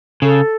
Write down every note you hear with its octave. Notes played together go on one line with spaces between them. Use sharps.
C#3 A4